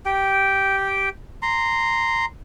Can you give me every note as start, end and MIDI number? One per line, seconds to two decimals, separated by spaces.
0.06 1.09 67
0.06 1.09 79
1.42 2.25 82
1.42 2.25 84